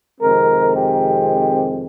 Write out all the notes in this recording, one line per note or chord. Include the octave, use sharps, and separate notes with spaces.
F2 C3 D#3 G#3 C4 A#4
G4